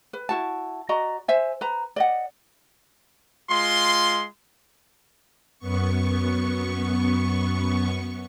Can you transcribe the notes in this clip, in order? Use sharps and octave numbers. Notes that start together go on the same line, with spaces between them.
B4
E4 F#4 A5
F#4 D5 D#5 A#5
C5 E5 G#5
B4 A#5
D5 D#5 F#5
G#3 F4 C6
F#2 B3 C#6